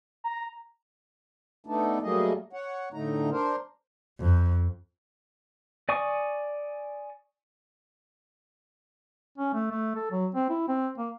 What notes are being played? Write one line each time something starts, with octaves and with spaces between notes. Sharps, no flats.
A#5
A3 B3 D4 D#4 A4
F#3 G3 A3 A#3 G#4 D#5
C#5 F#5
A2 D3 A3 D#4 A#5
D4 A#4 C5
F2
D5 G#5 C#6 D#6
C#4
A3
A3
A4
F#3
C4
E4
C4
A#3